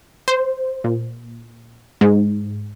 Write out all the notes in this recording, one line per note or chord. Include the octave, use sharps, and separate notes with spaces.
C5
A#2
G#2